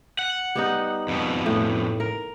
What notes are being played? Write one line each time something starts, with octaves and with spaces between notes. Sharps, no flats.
F#5
G3 B3 D#4
F2 B2
A2
A#4